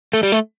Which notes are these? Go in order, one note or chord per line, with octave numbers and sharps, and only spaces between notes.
A3
G3
A3